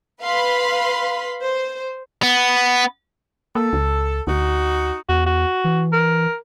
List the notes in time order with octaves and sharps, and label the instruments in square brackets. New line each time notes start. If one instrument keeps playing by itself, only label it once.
[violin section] B4 F5 B5 C6
C5
[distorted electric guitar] B3
[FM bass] A#3 [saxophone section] A4
[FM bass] C#2
[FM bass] D2 [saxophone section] D#4 F#4
[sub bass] E2 [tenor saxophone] F#4
[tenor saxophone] F#4
[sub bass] E3
[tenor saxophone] A#4